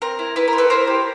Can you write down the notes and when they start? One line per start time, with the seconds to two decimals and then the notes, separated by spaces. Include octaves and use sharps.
0.02 C4 A#4
0.19 E4
0.36 E4 B4
0.48 A#4
0.53 C4
0.58 A4 B4
0.70 E4 A#4 C5
0.87 G4